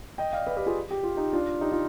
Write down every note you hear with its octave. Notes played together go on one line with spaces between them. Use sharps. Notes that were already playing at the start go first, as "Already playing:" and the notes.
D#5 G5
D5 F5
B4 D5
G4 B4
F4 G#4
G4
F4
D#4 G4
D4 F4
D#4 G4
D4 F4